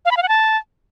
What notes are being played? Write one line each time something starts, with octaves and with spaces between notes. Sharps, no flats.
F5
B5
F5
F#5
A5